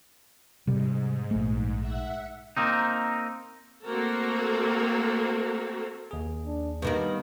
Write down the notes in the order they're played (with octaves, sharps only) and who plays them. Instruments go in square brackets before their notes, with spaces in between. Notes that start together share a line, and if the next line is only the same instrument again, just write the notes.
[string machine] G#2 [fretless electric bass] C3 G3
[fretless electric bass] A#1 A3
[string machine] E5 F#5
[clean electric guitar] A#3 C4 D#4
[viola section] A3 A#3 C4 F#4 A4 A#4
[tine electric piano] D#2 G#4
[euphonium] D4
[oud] G2 D#3 A#3 [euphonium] B3